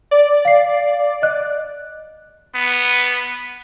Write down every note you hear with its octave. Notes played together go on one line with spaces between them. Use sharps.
D5
F5 C7
D#5 F#6
B3